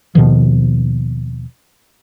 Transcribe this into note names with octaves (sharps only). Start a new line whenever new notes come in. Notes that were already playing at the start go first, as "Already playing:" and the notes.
D#2 B2 D#3 F3